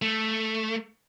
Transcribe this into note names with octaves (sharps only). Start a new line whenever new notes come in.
A3